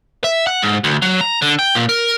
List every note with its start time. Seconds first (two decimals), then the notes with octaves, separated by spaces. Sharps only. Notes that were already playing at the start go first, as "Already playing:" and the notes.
0.24 E5
0.47 F#5
0.62 G#2
0.84 D2
1.02 F#3
1.21 A#5
1.42 D3
1.59 G5
1.75 A#2
1.89 A#4